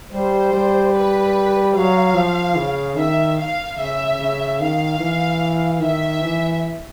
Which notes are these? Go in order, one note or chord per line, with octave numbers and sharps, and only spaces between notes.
G3 C5
G3
B4
F#3 F5
F3
C#3
D#3 E5
F5
C#3 E5
C#3
D#3 F5
E3
D#3 E5
E3